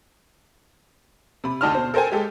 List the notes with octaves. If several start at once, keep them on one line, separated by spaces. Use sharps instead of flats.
C3 B5
D2 D#4 D5 A5 C6 F6
B2 C5
A4 A#4 C5 G5 G#5
G#3 G4 A4